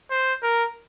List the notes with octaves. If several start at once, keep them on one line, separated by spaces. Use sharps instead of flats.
C5
A#4